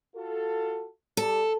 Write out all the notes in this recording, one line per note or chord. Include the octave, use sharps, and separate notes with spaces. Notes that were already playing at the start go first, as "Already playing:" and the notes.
F4 F#4 A4
G3 A4